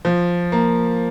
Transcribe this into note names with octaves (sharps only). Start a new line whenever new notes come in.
F3
A#3